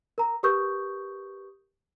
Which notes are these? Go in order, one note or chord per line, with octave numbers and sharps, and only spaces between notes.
A#4 A#5
G4 A#4 B4 C#6 D#6 G6